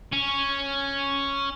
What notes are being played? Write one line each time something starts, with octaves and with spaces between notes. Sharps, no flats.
C#4